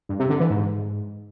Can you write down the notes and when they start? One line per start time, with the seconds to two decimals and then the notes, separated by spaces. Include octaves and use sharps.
0.09 G2
0.19 C3
0.30 D3
0.40 E3
0.50 G#2